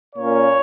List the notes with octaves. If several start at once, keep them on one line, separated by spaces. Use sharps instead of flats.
A#2 A#3 C#4 C#5